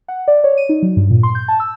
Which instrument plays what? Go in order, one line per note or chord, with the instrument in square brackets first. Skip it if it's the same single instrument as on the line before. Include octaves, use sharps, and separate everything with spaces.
[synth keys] F#5
D5
C#5
D#7
D#4
F#3
G2
A#2
C6
G6
A5
E6